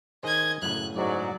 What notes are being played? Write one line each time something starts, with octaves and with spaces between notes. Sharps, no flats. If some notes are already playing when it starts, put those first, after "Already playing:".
D#3 G#4 C5 D#5 G#6
F#2 A2 C#3 F#6
G#2 F#3 D5